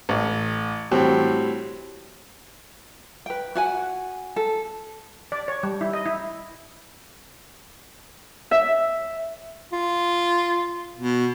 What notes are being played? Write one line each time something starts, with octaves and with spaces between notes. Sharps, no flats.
A1
A2 G3 C4 F#4
B4 G5
F#4 F#5 G#5
A4
D5
C#5
G3
E4
D#5
E4
E5
F4
B2